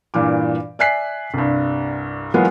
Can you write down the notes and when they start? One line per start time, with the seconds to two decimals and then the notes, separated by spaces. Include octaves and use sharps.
0.14 G2 A#2 E3 D6
0.79 D5 E5 G#5 F#6 B6 C7
1.34 C2 G2
2.34 E3 F#3 G#3 A#3 B3 F4